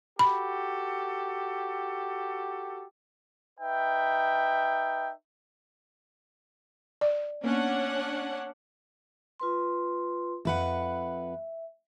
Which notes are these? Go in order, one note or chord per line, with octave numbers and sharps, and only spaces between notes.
F#4 G4 A4 B5
D#4 B4 E5 G5
D5
A#3 B3 C#4 D4 F#5
F4 B4 C6
F2 B4 E5 F#5